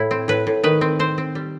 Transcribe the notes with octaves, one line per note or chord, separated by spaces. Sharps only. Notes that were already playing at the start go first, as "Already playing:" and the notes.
Already playing: A2 E4
C4
A2 B4
A2
D#3 B4
C4
C4 C5
C4
G3